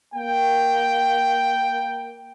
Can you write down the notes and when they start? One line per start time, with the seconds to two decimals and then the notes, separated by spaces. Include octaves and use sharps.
0.14 A#3 G5